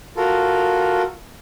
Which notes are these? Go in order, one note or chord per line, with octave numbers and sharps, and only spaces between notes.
F4 F#4 A4 A#4